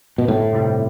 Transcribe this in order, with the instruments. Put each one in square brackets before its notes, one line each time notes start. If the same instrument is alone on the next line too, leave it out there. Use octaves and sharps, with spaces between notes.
[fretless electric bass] B2
[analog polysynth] G1 [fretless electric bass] A2
[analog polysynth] F2 C3 G3